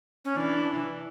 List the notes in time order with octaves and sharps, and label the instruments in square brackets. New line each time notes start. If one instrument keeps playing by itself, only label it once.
[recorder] C#4
[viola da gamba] E3 [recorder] D4